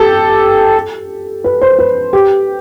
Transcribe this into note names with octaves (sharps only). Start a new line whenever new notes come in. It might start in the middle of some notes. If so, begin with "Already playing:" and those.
Already playing: G4 A4
B4
C5
B4
G4